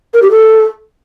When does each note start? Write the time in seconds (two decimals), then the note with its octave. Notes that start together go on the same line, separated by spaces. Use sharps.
0.14 A#4
0.22 G4
0.31 A4